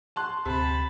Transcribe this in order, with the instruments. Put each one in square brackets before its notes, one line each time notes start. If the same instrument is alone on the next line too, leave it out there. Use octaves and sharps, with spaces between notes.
[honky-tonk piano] A5 C6 F#6
[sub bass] D2 [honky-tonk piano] C3 [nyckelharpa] A5 B5